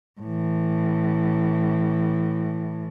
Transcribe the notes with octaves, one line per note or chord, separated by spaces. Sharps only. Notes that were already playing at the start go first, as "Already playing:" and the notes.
A2 E3